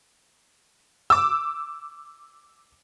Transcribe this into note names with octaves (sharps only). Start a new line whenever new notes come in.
D6 E6